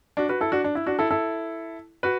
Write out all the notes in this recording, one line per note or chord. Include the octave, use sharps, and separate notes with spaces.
D4 F#4
F#4 B4
E4 A4
D4 F#4
D4
E4
D4 F#4
E4 A4
E4 A4
F#4 B4